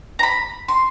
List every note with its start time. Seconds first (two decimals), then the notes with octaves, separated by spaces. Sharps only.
0.19 A#5
0.23 B5
0.68 C6